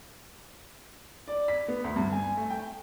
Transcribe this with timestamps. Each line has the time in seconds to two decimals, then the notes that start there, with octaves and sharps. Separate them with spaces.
1.28 D5
1.48 B6
1.68 B3
1.84 D2
1.96 G2
2.12 G#5
2.37 A3
2.50 G5